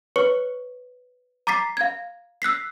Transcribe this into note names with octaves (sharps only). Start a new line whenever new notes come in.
B4 C#5 C#6 C#7
A#5 D6 A6 B6 C7
F5 G#6
E6 F#6 B6 C7